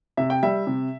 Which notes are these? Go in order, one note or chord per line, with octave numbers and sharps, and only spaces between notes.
C3 E5
G5
G3 E5
C3